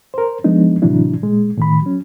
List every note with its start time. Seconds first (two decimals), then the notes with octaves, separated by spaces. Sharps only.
0.14 A#4 C5
0.44 F3 G#3 B3 D4 D#4
0.82 A2 C3 E3 F#3 D4 E4
1.22 A#2 G#3
1.57 A2 D#3 B5
1.82 F#3 C#4